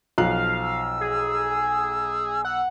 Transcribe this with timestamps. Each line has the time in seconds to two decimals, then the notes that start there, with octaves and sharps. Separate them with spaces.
0.18 B1 F3 F5 F#6
0.61 E6
1.01 G#4
2.45 F#5 E6